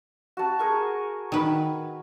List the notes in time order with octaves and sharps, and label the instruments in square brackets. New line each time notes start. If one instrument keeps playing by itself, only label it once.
[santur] F#4 A5
G#4 A#4 C#6
[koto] D#3 B4